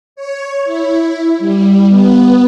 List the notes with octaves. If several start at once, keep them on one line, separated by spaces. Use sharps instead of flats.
C#5
E4
G3
B3